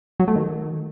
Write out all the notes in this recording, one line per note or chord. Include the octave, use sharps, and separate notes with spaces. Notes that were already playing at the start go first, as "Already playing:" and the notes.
F#3
A3
D#3